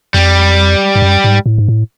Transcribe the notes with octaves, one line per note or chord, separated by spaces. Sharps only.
F2 G3
G2
F#2
G#2
A2
G#2
A2